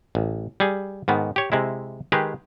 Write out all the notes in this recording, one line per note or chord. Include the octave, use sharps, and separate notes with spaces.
A1
G3 G#4
G#2 D#3 B3
G4 C#5
C3 G#3 E4
D#3 G#3 G4 G#4 B4